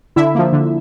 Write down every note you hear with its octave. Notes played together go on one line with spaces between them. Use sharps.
D3 E4 E5
F3 A#3
D3